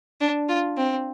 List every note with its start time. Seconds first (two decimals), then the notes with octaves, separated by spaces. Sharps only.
0.21 D4
0.49 F4
0.77 C4